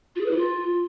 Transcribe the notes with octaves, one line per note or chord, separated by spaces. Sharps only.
F4
G#4
B4
E4
F4